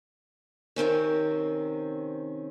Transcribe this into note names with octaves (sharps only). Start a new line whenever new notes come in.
C3 D#3 C4 C#4